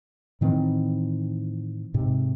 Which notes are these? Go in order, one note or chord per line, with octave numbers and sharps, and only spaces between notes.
A2 D#3 E3 C4
G#2 C3